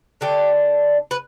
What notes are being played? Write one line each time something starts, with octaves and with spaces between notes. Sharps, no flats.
D3 A3 D4 G4
B4